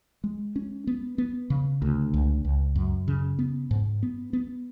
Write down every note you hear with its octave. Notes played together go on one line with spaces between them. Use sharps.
G#3
C#4
B3
B3
C#3
D2
C#2
C#2
F#2
C#3
B3
G#2
B3
B3